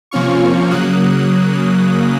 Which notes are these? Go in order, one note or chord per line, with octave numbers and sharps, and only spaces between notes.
C3 F3 A#3 C#4 F4 C#6 F6
C#3 F#3 A#3 D#6 F#6